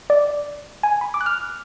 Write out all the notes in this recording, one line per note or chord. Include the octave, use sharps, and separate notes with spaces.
D5
G#5
B5
D6
F#6
F6